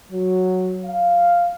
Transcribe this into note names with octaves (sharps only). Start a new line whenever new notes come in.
F#3
F5